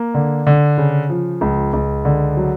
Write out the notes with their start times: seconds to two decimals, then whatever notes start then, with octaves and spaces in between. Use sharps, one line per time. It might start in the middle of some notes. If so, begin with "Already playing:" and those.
Already playing: A#3
0.14 D3
0.47 D3
0.78 C#3
1.10 F3
1.41 C#2
1.73 C#2
2.05 D3
2.37 F#3